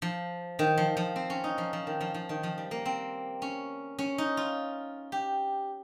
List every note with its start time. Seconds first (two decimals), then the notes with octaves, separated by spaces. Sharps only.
0.02 F3
0.59 D#3
0.78 F3
0.97 F3
1.16 C4
1.30 C#4
1.44 D#4
1.58 F3
1.73 F3
1.87 D#3
2.01 F3
2.14 F3
2.29 D#3
2.43 F3
2.58 G3
2.71 A#3
2.85 C4
3.42 C#4
3.99 C#4
4.18 D#4
4.37 F4
5.12 G4